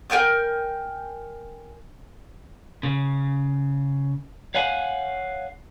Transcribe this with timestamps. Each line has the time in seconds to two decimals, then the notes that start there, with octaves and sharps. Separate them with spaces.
0.10 A#4 G5 G#5 G6
2.83 C#3
4.55 C#5 F5 F#5 G#5